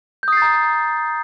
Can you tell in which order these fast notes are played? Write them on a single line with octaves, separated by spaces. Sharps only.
G6 D#6 C7 A6 A#5